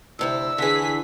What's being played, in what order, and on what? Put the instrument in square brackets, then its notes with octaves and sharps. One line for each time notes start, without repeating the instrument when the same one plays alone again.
[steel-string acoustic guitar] D2 C3 E4 [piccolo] E6
[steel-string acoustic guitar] D3 E3 [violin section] G#4 B6